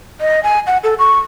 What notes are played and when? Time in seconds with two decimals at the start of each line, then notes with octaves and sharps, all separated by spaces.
0.21 D#5
0.44 G#5
0.67 F#5
0.84 A4
0.99 C#6